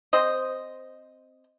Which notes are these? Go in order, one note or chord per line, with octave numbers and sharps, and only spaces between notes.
C4 C5 D#5